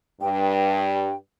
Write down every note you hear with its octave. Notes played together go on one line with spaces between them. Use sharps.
G2 G5